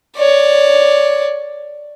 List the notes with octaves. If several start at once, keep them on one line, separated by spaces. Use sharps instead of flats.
C#5 D5